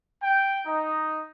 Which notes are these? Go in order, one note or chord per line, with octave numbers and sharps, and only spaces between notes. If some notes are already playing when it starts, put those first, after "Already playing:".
G5
D#4